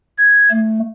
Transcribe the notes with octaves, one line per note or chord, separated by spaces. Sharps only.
G#6
A3